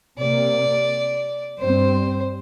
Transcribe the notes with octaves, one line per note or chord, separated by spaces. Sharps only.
C3 A#3 D5
G2 G3 C4 C5